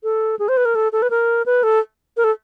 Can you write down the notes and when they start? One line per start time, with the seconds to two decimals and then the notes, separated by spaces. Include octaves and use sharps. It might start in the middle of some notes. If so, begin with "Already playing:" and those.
0.03 A4
0.39 G#4
0.48 C5
0.57 B4
0.65 A#4
0.75 A4
0.92 A4
1.02 B4
1.10 A#4
1.46 B4
1.63 A4
2.17 A#4
2.24 A4